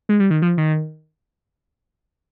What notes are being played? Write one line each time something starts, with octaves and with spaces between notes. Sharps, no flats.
G#3
G3
D#3
F3
D#3